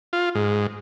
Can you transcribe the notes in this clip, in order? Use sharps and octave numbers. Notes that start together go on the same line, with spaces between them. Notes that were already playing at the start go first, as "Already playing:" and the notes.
F4
G#2